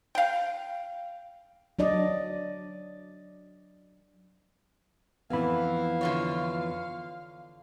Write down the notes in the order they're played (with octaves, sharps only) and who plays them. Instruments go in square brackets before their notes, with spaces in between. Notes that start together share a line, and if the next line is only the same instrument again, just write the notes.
[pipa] F5 G5
[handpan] F#3 D4 D5 D#5
[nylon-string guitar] F2 E3 [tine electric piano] B3 B5 [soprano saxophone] F5
[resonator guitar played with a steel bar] D3 F4 C#5